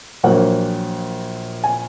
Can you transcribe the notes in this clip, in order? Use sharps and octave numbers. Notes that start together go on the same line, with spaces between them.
A#1 A#2 F#3 A#3 F#5
G#5